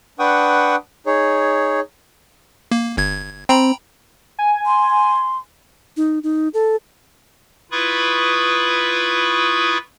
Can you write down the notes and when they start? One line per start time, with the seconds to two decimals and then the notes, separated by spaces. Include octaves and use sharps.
0.19 D4 B4 F#5 G5 C#6 D#6
1.07 D#4 G#4 C#5
2.71 A#3
2.97 G1 G#6
3.49 C4 G5 A#5 B5
4.39 G#5
4.66 C6
5.97 D#4
6.23 D#4
6.54 A4
7.72 E4 F4 B4 B5 C#6 D#6